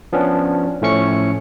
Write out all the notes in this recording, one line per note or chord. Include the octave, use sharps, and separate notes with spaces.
F3 B3 C#4 D4
A2 F3 A3 C#4 C#6 C#7